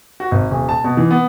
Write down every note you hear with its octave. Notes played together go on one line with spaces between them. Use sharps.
F#4
G#1
D#1
A5
B2
E3
B3